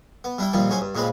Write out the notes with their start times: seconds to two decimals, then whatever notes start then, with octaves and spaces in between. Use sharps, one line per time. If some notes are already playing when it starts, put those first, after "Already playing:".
0.24 B3
0.38 G3 D4 E4 G5
0.53 A#1 D#2 C3 G3 C4 F4
0.69 C#2 F#3 C#4 C5 G#5
0.81 G2
0.95 A#2 C#3 G#3 C4 B4